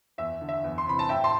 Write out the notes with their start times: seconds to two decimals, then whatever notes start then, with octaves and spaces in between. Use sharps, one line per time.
0.18 E2 E5
0.41 D3
0.49 E5
0.64 E2
0.78 C6
0.87 C3 E3 B5
0.99 A5
1.09 A2 E5 G5
1.24 A5 C6